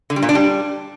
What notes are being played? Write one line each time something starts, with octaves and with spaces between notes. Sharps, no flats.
D3
G3
A#2
D4
G3